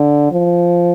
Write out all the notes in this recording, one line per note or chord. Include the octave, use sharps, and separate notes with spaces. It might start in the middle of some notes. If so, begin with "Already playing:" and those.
Already playing: D3
F3